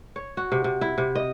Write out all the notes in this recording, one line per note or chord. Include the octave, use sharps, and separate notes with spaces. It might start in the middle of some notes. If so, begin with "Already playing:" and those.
C#5
F#4
C3
C3
E4
C3
D#5